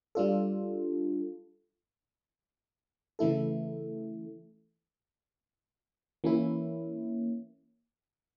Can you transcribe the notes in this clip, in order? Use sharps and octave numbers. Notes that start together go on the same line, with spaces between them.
G3 D4 F4 A4
C#3 E3 A3 E4 A4
E3 A#3 C#4 E4